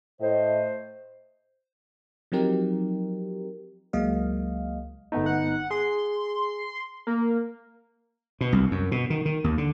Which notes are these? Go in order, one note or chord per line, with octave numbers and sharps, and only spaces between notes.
A2 C5 D#5
F3 F#3 C4 D#4 G4 A#4
C#2 F#3 G#3 A#3 D#5 F5
G1 A3 B3 D#4
F#5
G#4 C6
A#3 A#4
B2
C2
F#2
B2
D#3
D#3
D#2
D3